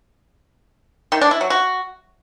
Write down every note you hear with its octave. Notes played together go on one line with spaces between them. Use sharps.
D#3
D4
E4
F#3
F#4